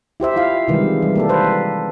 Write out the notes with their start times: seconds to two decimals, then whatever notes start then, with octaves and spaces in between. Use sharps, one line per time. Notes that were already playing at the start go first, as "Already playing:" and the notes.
0.20 E4 G4 C5 E5
0.36 E4 F4 F5
0.68 C3 D#3 E3 G3 G#3
1.02 G3
1.16 A#3 G4 A4
1.29 B4 C5